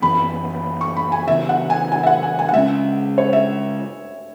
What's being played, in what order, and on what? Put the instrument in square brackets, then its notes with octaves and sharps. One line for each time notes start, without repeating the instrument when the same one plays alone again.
[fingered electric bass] F#2 E3 B3 [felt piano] B5
[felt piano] C#6
B5
G#5
[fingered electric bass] C#3 E3 B3 [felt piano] E5
[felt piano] F#5
G#5
G#5
E5
F#5
G#5
G#5
F#5
[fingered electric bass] C#3 G#3 C#4 [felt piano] E5
[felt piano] C#5
E5